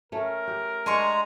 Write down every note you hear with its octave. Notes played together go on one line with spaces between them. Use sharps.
A3 C#4 A#4
G4
G#3 D4 G#5 A#5 C6 C#6